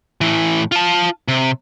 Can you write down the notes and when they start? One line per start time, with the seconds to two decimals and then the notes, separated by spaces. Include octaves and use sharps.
0.21 A2 E3
0.72 F4 A5
1.28 C3